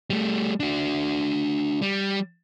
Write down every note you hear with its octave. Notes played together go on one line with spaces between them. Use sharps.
G3 A3
D4 F#4
G3